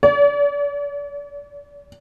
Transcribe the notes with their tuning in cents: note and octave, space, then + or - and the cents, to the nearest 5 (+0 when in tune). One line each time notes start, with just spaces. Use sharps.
D5 -45